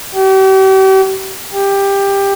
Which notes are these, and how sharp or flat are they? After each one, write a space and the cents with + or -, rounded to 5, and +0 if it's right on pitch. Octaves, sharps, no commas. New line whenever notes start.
G4 -40
G4 +15